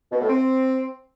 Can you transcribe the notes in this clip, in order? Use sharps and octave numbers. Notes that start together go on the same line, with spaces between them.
B2
A2
C4